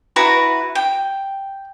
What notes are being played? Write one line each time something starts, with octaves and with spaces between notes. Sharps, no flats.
E4 F#4 B4 A#5
G5